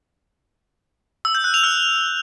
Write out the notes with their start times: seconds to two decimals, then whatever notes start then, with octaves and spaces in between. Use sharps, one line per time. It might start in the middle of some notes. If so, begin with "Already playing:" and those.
1.25 E6
1.35 G6
1.44 F#6
1.54 F7
1.64 F6